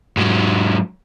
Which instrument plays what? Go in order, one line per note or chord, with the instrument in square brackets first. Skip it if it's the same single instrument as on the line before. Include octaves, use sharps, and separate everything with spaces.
[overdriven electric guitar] G#2 F#3